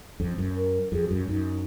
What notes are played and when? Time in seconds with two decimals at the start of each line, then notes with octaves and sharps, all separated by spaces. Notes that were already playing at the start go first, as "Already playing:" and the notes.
0.20 F2
0.38 F#2
0.56 A#4
0.92 F2 G#4
1.05 F#4
1.11 F#2
1.28 F#2 D#4